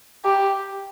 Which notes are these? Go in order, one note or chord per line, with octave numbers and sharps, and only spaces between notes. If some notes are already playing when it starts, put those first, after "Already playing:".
G4